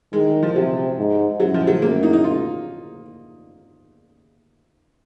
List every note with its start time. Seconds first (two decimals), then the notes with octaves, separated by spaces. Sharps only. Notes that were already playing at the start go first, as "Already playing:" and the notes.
0.13 D#3 G#3
0.43 F3
0.55 C3 F#3
0.97 G#2
1.40 F#2 F#3
1.54 F3
1.67 F#3
1.82 F#2 A#3
2.03 D#4
2.13 D#4
2.24 F4